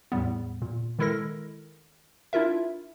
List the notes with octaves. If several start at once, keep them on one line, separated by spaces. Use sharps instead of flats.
E2 A2 G3 B3
A#2
D#3 G#3 E4 A4 A#4 A#6
D4 E4 F4 A#4 E5